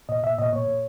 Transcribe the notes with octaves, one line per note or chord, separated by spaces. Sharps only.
A#2 D#5
A#2 E5
A#2 D#5
A#2 C#5
A#2